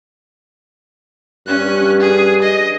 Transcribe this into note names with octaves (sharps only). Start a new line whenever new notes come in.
G2 C#4 F#6
G#4
D#5